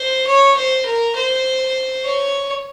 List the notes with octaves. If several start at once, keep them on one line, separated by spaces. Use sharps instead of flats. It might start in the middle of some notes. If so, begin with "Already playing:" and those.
Already playing: C5
C#5
C5
A#4
C5
C#5